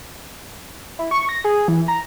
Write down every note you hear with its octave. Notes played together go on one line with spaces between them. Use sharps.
E4
C#6
A#6
G#4
E3
A#5